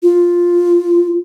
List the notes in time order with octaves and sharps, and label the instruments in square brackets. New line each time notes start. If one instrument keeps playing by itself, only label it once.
[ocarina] F4